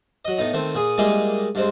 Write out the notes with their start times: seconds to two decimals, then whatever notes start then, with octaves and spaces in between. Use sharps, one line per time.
0.25 F#3 D#5
0.37 A2 B3 D#4 A#5
0.53 D#3 A3 C4
0.75 A#2 G#4 D#6
0.98 G3 G#3 A#3 E4 G#4 D#5
1.55 G2 G#3 C4